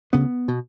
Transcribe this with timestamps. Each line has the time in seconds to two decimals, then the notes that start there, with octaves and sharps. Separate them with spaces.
0.13 D2 C#3 B3
0.48 B2